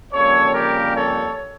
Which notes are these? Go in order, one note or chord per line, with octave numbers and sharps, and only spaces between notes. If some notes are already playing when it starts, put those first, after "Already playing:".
F2 C#3 G3 A#3 A4 C#5
G4 A#4
A4 C#5